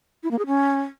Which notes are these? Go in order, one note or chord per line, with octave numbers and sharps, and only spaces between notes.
E4
A#3
G#4
C#4